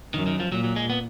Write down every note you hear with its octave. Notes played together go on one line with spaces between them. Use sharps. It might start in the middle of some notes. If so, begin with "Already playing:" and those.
F#2 D#3
D#3
F3
A#2 F#3
F#3
G#3
B3